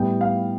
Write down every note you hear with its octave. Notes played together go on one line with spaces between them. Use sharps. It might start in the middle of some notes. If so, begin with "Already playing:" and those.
Already playing: A2 G3 B3 G5
F5